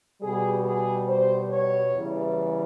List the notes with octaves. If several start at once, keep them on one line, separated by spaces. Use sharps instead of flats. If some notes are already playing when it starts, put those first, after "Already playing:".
B2 G3 G#4
G#4
C5
C#5
E2 C#3 E3 G3